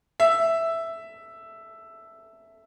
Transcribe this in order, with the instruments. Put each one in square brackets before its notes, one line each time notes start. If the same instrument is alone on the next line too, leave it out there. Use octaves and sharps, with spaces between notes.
[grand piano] E5